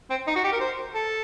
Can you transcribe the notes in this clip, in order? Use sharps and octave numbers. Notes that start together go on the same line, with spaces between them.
C4
D#4
F#4
G4
A#4
C5
A4